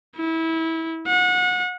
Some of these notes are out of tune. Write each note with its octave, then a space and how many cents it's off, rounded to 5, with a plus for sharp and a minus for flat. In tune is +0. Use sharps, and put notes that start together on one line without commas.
E4 -25
F#5 -30